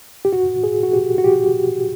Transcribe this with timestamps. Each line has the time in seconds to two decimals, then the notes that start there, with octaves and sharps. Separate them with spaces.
0.25 G4
0.33 F#4
0.64 G#4
0.83 F#4
0.93 G4
1.18 F#4
1.24 G4